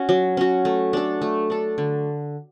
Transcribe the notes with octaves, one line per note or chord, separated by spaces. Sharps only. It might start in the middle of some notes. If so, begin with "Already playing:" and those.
Already playing: C#4 F#4
F#3
C#4 F#4
A3
D4 A4
A3
D4 A4
D3